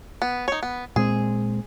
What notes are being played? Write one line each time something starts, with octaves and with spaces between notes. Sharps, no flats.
B3
D#4 C#5
B3
A#2 G#3 C4 G#4